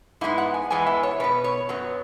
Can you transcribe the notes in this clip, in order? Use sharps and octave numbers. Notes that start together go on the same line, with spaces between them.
G#2 G#3 B3 E4
F#5
G#5
E2 E3 G#3 B3 G#5
E5
C#5
B2 B3 B4
C#5
F#2 F#3 B3